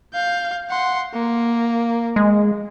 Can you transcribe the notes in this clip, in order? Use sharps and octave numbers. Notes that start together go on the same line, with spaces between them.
F5 G6
F#5 C6
A#3
G#3